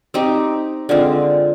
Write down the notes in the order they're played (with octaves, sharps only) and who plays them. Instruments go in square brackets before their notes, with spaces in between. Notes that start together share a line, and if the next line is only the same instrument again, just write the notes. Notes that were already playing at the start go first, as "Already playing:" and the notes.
[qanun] C4 D#4 G4
D3 G#3 C4 F4